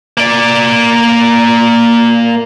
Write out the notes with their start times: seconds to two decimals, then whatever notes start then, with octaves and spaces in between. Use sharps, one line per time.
0.18 A#3 D5